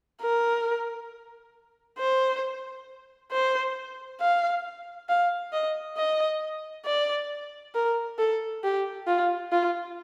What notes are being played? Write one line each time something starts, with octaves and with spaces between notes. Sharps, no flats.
A#4
C5
C5
F5
F5
D#5
D#5
D5
A#4
A4
G4
F4
F4